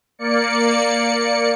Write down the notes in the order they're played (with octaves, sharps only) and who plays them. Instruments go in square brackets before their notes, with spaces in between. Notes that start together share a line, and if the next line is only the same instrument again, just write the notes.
[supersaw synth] A#3 D5 C#7